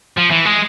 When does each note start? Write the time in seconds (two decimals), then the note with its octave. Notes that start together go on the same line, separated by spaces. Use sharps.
0.18 F3
0.32 E3
0.46 G#3